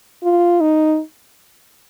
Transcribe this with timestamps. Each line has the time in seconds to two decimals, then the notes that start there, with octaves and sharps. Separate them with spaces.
0.24 F4
0.61 D#4